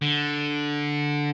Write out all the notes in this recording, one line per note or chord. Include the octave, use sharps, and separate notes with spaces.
D3